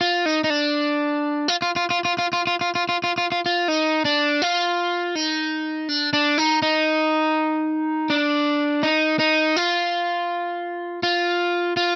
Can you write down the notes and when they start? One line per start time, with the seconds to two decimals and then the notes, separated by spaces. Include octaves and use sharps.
0.01 F4
0.26 D#4
0.44 D#4
0.50 D4
1.48 F4
1.62 F4
1.76 F4
1.90 F4
2.05 F4
2.18 F4
2.33 F4
2.47 F4
2.61 F4
2.75 F4
2.89 F4
3.04 F4
3.18 F4
3.32 F4
3.46 F4
3.68 D#4
4.05 D4
4.42 F4
5.15 D#4
5.89 D4
6.13 D4
6.38 D#4
6.62 D#4
8.10 D4
8.83 D#4
9.19 D#4
9.56 F4
11.03 F4
11.77 F4